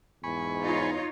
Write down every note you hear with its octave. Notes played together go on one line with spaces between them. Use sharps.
E2 G#2 G#5 B5 C#6
D#4 F4 C#5